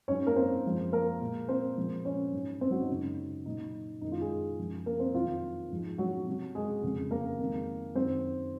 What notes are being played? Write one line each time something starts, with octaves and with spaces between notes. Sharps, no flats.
G#2 F#3 C#4 C#5
A#3 A#4
C4 C5
F#2 F3 G#3
A#3 A#4
A#2 G#3
C4 C5
A#2 F3 G#3
C#4 C#5
G#2 F#3
C4 C5
F#3 F#4
D#4
F#2 C#3 G#3
A#2 F#3 D#4
F#2 D#3 G#3 D#4
F4
G#3 G#4
F#2 F3 G#3
A#3 A#4
C4 C5
F2 D#3 F#3 F4
G#2 F3 G#3
F#3 F#4
C3 F#3
G#3 G#4
F2 C#3 F#3
A#3 A#4
F2 D#3 G#3
F#2 D#3 F#3 C4 C5